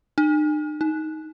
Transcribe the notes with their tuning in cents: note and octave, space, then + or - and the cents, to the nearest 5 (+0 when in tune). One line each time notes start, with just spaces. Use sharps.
D#4 -45
D#4 +10